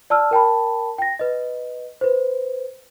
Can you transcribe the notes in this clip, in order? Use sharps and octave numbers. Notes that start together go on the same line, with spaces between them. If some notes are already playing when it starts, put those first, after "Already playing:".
D5 A5 E6 F6
A#4 G5 A5 B5
G5 A#6
B4 D#5
B4 C5